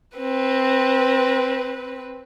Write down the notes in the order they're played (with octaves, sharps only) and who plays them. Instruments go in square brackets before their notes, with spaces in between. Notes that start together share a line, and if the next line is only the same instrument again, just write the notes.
[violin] C4 B4